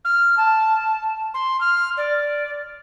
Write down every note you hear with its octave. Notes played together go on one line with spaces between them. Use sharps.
F6
A5
C6
F6
D5